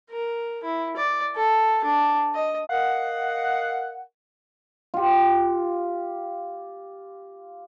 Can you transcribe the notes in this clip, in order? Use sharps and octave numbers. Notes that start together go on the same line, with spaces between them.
A#4
E4
D5
A4
D4
D#5
A#4 D#5 F5 F#5
F4 G4